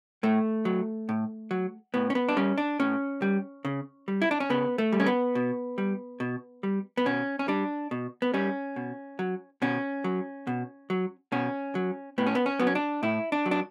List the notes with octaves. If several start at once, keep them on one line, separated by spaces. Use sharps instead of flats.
A2 A3
F#3
A2
F#3
A2 B3
C#4
B3
D4
G3 C#4
D4
A2 C#4
G3
C#3
G3
E4
D4
C#4
C#3 B3
A3
G3
C#4
B3
B2
G3
B2
G3
B3
B2 C#4
C#4
G3 D4
B2
B3
G3 C#4
B2
F#3
B2 C#4
F#3
B2
F#3
B2 C#4
F#3
A2 B3
C#4
B3
C#4
F#3 B3
C#4
D4
A2 E4
D4
F#3
D4